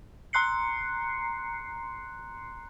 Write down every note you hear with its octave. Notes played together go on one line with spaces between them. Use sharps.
A#5 C6 F#6 C7 C#7